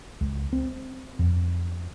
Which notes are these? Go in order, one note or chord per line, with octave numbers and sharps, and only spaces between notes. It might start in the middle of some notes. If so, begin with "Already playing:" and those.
C#2
C4
F2